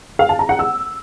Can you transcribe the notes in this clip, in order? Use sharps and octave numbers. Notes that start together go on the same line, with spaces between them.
F5
A5
A#5
F#5
E6